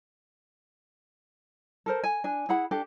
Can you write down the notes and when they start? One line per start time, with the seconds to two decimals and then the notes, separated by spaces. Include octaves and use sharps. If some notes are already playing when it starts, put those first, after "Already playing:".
1.86 A4 A#4 C5
2.04 G#5
2.24 D4 G#5
2.49 E4 G#4 F#5 B5
2.71 D4 G4 A4